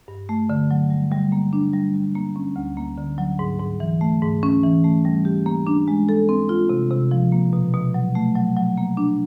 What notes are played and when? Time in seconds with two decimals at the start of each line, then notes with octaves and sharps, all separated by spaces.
0.08 G2
0.29 A3
0.50 D3
0.71 F#3
0.90 G3
1.12 G3
1.32 A#3
1.53 D4
1.73 G3
1.94 G3
2.15 A#3
2.36 C#4
2.56 D2
2.77 A#3
2.98 D3
3.18 F#3
3.39 G#2
3.59 G#2
3.80 E3
4.01 A3
4.22 G#2
4.43 C#4
4.63 E3
4.84 A3
5.05 G3
5.25 G4
5.46 A#3
5.67 D4
5.88 G#3
6.09 A4
6.29 C4
6.49 F4
6.69 C3
6.91 C3
7.11 F3
7.32 A#3
7.53 B2
7.74 B2
7.94 F#3
8.15 A3
8.35 F#3
8.56 F#3
8.77 A#3
8.97 D4